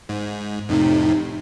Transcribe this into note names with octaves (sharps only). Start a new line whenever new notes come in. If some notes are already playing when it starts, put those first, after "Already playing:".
G#2
F2 A2 C3 D#4